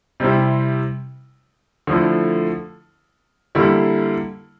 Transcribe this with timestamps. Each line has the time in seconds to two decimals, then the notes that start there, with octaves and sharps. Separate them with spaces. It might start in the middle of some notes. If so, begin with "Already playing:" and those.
0.20 C3 G3 C4 E4
1.87 D3 F3 A3 E4
3.55 D3 G3 A#3 E4